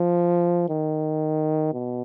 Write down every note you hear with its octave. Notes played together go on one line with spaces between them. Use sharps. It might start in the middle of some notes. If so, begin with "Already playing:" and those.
Already playing: F3
D#3
B2